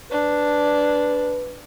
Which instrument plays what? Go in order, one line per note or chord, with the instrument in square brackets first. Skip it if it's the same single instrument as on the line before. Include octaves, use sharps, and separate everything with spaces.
[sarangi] D4 [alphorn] B4